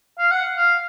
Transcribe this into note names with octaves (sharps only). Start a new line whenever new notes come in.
F5
F#5
F5